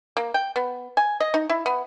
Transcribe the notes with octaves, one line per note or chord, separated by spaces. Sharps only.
A#3
G5
B3
G#5
D#5
D#4
E4
B3